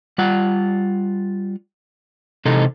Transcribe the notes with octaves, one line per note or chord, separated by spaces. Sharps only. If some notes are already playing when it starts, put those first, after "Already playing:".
G3 F4 F#5
C3 E3 G#3 D#4 A4